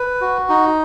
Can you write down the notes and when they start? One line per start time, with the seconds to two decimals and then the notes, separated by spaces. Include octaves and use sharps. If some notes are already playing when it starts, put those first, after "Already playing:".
Already playing: B4
0.21 F#4
0.49 D#4